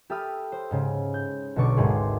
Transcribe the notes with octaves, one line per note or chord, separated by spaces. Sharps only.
G4 A4 E5 B5 D#6 F6
C5
G#2 C#3
G6
B1 B2 D3 C#6 D6
G#1 D2 G#2 G#4 C6